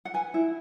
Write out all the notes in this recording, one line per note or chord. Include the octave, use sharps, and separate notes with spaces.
F#5
B4 G#5
E4